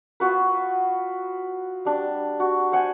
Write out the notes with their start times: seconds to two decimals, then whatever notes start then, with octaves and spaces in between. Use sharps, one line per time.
0.20 B3 F4 F#4 B4
1.85 G3 D4
2.40 F#4
2.72 C5 F#5 G#5